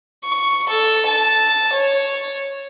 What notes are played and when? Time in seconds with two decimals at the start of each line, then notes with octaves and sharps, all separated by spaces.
0.24 C#6
0.68 A4
1.06 A5
1.73 C#5